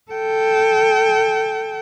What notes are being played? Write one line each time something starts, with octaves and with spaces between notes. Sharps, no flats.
A4 G5